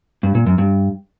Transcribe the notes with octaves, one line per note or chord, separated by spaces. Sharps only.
G2
A#2
F#2
G2